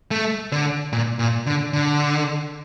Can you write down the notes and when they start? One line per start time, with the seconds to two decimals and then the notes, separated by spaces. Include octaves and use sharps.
0.11 A3
0.52 D3
0.93 A#2
1.19 A#2
1.46 D3
1.73 D3